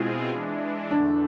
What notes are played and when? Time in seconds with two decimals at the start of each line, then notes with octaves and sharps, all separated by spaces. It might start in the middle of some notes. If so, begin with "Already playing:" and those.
Already playing: B2 G#3 C4 E4 F4 G#4
0.29 E3 G#3 D4
0.91 E2 D3 A3 D4